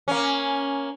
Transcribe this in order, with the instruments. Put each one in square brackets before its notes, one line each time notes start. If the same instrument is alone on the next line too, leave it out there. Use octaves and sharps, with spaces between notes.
[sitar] A#3 C#4